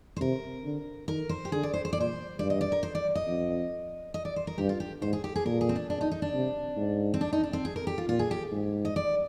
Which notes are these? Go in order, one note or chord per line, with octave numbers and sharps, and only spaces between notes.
C5
C3 A#4
D3
D#3 A#4
C5
G4
D3 G#4
D5
C5
C5
D5
A#2
C5
G2 D5
D#5
D5
A#4
C5
D5
D#5
F2
D#5
D5
C5
A#4
G2 G4
F4
G4
G#2 C5
G#4
G4
G#4
A#2 A#4
G#4
C4
D4
D4
D#4
D#4
D4
C3
G#2
C4
D4
D#4
D4
C4
G#4
A#4
G4
F4
A#2 F4
G#4
G4
G#2
D#5
D5